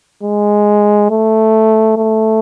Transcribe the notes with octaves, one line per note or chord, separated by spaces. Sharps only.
G#3
A3
A3